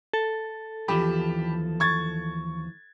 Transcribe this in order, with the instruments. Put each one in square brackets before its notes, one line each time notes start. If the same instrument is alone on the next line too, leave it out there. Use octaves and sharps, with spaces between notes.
[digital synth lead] A4
[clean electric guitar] D#2 E3 F3 [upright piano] G4 B5
[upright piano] C#6 G#6 A6